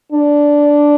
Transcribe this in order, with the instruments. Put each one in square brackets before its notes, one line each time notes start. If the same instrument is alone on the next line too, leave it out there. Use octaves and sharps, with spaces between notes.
[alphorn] D4